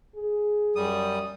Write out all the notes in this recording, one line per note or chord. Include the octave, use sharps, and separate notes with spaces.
G#4
F#2 G3 D#6